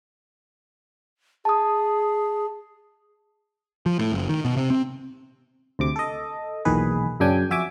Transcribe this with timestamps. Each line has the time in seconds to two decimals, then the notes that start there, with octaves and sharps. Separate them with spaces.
1.45 G#4 A5 D#6
3.86 F3
3.99 A2
4.12 F#1
4.29 D#3
4.45 B2
4.56 C3
4.70 C4
5.79 D2 C3 D6
5.96 A4 D#5
6.65 B1 E2 A#2 D#3 G#4 B4
7.20 F#2 C#3 D4 G5 G#5
7.50 F2 F#4 E5 G#5 D6